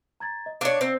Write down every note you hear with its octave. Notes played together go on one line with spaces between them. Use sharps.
A#5 G#6 A6
D#5
D4 C#5 D#5 F5
C4